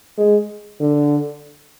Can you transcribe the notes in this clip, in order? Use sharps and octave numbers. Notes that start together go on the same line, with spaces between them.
G#3
D3